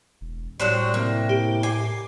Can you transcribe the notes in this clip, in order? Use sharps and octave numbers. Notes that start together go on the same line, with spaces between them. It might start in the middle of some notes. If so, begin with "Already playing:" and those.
E1
A2 F#3 G3 D4 C5
C3 A#3 C4 E4
G4
G#5 D6 C7